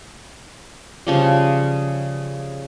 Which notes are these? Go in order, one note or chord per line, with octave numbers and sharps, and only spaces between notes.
C#3 F3 G3